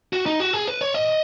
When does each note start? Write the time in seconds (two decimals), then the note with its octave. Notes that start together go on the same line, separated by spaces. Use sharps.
0.13 F#4
0.26 D#4
0.40 F#4
0.53 G#4
0.68 B4
0.81 C#5
0.94 D#5